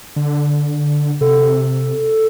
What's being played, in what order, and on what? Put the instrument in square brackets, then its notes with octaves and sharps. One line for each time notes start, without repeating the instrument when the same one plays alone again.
[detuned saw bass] D3
[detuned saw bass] C3 [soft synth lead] A4